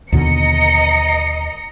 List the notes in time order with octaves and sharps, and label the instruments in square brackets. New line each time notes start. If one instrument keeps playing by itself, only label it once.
[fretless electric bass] D#2 B2 D3 [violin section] D#5 A#5 C#7